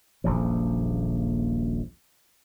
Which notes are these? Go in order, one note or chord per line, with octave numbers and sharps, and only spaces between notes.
D#1 A#1 F#2 F3